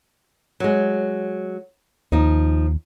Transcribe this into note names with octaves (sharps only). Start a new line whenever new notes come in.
F#3 G#3
D#2 F3 D#4